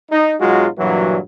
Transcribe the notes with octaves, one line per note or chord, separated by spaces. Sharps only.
D#4
B1 F#3 G#3 F4 F#4
G2 A#2 E3 F#3